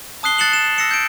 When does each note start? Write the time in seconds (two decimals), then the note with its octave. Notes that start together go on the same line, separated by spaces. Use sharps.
0.23 A5 D#6 F#6 C7 G7
0.38 F#6 A6 C7 C#7 E7 F#7
0.53 E7
0.66 F#7
0.78 E6 A#6 C7 C#7 E7
0.91 G6 D7